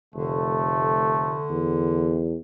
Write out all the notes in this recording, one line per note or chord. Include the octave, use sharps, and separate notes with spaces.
F1 D3 A3
E2